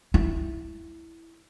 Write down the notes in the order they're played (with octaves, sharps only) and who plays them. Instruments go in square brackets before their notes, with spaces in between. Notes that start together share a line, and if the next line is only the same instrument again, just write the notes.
[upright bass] E4